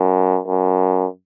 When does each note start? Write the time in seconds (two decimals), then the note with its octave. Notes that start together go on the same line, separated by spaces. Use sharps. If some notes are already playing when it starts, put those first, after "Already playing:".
Already playing: F#2
0.47 F#2